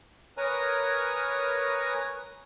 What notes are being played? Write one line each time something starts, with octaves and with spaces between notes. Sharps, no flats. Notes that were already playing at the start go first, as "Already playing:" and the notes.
A#4 B4 C#5 G#5 A#5 D#6